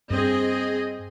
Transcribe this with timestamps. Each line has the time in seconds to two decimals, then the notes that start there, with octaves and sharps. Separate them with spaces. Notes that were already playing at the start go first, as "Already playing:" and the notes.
0.10 G2 C4 G#4 D#5